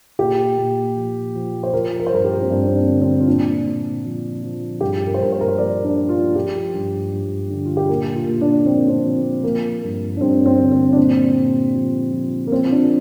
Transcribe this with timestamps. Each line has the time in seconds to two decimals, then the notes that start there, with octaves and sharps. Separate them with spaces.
0.19 A#2 G4
0.57 A#2
0.96 F3
1.35 F3
1.63 C5
1.73 F3 A#4
1.99 A#4
2.06 C5
2.11 G2 A#4
2.24 G4
2.42 C4
2.50 G2 D4
2.67 C4
2.75 D4
2.88 D3
3.02 C4
3.20 F4
3.27 A#2 D4
3.66 A#2
4.04 F3
4.43 F3
4.81 G2 G4
5.06 A#4
5.14 C5
5.19 G2 A#4
5.32 C5
5.41 A#4
5.48 C5
5.58 F3 D5
5.84 D4
5.96 F3
6.09 F4
6.35 F3 G4
6.74 G2
7.12 G2
7.50 D3
7.66 F4
7.77 G4
7.89 A#2 A#4
8.15 F4
8.28 A#2
8.41 D4
8.66 F3 C4
8.77 A#3
8.88 C4
9.05 F3
9.43 F3 A#3
9.83 G2
10.17 D4
10.20 G2 C4
10.46 C4
10.59 D3
10.72 C4
10.92 D4
10.97 A#2 C4
11.36 A#2
11.74 F3
12.12 F3
12.47 A#3
12.51 F3 C4
12.64 F4
12.71 D4